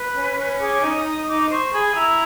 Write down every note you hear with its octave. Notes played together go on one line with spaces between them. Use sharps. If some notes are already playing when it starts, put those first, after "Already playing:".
Already playing: B4
C#4
C#4
G#4 D6
D#4
D#6
D#4
D#4 D6
C5 C#6
G#4 B5
E4 A#5